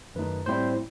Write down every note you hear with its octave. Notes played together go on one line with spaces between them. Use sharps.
F#2 D#3 A3 D#4 B4
A2 G3 C4 E4 C5